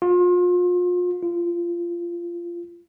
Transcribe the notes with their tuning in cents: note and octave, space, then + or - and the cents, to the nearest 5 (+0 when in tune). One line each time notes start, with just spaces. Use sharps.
F4 +35
F4 -20